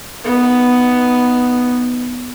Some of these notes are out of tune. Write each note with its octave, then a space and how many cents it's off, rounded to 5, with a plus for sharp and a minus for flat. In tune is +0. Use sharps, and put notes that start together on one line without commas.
B3 +0 D#4 +0